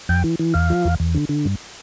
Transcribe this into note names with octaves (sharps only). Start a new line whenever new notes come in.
F2 G5
E3
E3
E2 F5
F3
E2
E2
D3
D3
G2